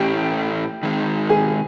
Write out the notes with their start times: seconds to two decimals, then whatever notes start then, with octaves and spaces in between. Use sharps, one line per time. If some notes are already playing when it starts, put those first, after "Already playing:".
Already playing: A2 E3 A3 C#4 E4 G4 G5
0.83 D#3 G#3 C4
1.30 G#4 G#5